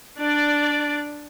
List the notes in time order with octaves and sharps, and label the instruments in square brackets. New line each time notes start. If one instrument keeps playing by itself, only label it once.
[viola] D4 D5